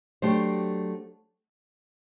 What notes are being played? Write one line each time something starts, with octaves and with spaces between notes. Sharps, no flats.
F#3 A3 D4 G4 C5